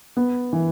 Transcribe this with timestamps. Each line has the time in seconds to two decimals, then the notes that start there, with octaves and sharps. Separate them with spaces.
0.17 B3
0.53 E3